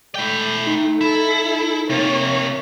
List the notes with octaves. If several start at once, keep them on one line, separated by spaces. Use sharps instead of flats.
A3 E4 G5
D#4
E4 A4
C3 A#3 F4 C#5